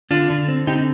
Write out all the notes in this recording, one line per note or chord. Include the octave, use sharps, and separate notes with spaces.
D3 D4 F4
D3
C4
D3 D#4 G4